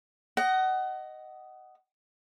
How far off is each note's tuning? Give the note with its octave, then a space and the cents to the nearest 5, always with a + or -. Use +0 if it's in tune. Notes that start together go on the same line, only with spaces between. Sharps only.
D#5 +0 F#5 +25